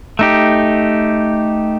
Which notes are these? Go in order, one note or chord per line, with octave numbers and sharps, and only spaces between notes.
A3 D#4 G4